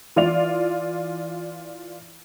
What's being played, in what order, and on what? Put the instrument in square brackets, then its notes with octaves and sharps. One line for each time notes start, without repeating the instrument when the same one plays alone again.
[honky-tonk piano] E3 F4 D5 F7